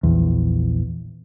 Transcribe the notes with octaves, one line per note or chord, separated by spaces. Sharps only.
A#1 E2